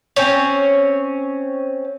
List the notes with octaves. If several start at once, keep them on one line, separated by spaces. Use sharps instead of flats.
C4 C#4 C#5